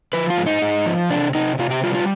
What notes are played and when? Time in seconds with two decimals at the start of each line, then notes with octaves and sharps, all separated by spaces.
0.13 F3 B4
0.30 F4
0.37 G#2
0.46 D#4
0.62 G#2
0.86 F3
1.10 C3 D4
1.35 C3 D#4
1.59 C3 F4
1.70 G4
1.83 G3 F4
1.95 F4